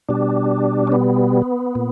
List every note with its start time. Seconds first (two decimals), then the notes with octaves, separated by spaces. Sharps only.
0.09 B2 G3 D4
0.87 C#4
0.92 B3
1.75 A#2